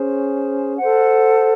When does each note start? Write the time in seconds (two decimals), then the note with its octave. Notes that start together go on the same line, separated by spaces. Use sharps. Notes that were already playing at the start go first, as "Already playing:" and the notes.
Already playing: C#4 G#4 C5
0.78 A4 C5 F#5